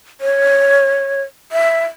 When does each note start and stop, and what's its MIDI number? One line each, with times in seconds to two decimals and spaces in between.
0.21 1.22 73
1.52 1.85 76